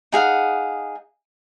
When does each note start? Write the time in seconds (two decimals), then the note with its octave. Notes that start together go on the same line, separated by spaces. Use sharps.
0.12 D#4 G#4 F5 F#5